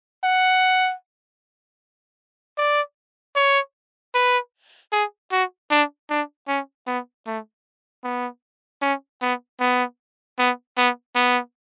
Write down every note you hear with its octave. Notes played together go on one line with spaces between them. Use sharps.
F#5
D5
C#5
B4
G#4
F#4
D4
D4
C#4
B3
A3
B3
C#4
B3
B3
B3
B3
B3